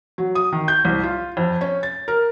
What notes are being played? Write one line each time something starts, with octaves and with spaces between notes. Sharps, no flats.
F#3
D#6
D#3
G6
C2
F4
F2
C#4
A6
A#4